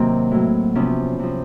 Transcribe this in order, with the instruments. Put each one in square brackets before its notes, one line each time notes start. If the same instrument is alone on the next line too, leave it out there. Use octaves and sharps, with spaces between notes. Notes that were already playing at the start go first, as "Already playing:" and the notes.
Already playing: [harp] C3 D#3 F#3 A#3 C4
A2 F#3
C3 F3 B3 C#4
C3 F3